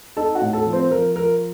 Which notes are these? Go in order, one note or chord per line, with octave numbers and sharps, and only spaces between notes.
D#4 A4 A5
F#4 F#5
A2
A4 A5
F3
C4 C5
F3 A#4
F3 A#4